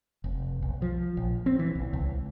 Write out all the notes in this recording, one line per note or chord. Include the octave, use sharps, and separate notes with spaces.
F1
B1
F3
A#1
C4
E3
B1
C#2